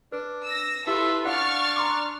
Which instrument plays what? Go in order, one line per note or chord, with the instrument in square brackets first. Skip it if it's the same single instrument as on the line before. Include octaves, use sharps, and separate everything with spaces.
[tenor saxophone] D4 [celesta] B4
[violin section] E6 A#6
[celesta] E4 G4 [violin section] F4 A4 B4 [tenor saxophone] E5
[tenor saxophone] D4 [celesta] F5 F#5 [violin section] C#6 F6 A6
[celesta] A#5 C6 D6